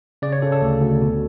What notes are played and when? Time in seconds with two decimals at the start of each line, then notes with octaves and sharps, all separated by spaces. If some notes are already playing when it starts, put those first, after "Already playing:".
0.22 C#3 D5
0.33 C#5
0.42 C#3 A4
0.52 A4
0.62 D2
0.81 D2
1.02 B2